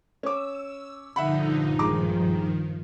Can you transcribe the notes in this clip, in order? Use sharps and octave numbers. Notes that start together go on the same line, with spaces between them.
C#4 D6 E6
A#1 G2 D3 F3 D#4 E5 F#5 B5
D#3 G#3 A#5 D6